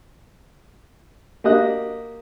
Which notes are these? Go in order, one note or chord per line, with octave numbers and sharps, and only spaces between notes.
A#3 F#4 G4 D#5 D#6 F#6